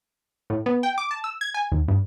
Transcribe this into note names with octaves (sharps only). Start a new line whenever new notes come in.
A2
B3
G5
D6
A5
E6
G#6
G#5
D#2
G2